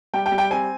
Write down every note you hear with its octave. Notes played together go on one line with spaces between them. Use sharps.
G3 G5
G5
G3
G5
C4 G#5